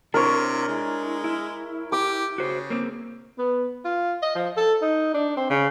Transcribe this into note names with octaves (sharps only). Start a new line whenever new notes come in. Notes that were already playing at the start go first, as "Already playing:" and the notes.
C3 D4 E4 A#4 C#5
G#3
E4
G4 D6
C#3 F#4 C5
A#3 C4
B3
F4
D#5
F3
A4
D#4
D4
C4
C#3